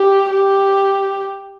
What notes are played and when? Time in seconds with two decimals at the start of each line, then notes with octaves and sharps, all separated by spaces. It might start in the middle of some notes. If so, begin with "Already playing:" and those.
Already playing: G4
0.30 G4